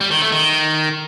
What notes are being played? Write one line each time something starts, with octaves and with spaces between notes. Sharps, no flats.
G3
D#3
A3
D#3